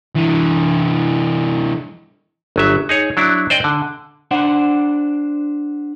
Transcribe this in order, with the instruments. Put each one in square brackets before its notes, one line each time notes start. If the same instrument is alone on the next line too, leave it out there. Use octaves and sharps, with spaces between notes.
[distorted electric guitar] E3 D4
[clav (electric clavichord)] G1 F#3 E5
D#4 G#4 C#5
F#3 D4 E4
C5 D5 D#5 G5
D3
[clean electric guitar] D4 C5 F#5